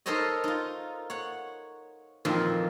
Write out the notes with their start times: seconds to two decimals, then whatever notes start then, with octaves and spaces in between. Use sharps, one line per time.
0.06 D#4 A4 A#4 C5 C#5 D#5
0.44 D#4 F4
1.10 C#5 F#5
2.25 F2 A#2 D#3 E3 F4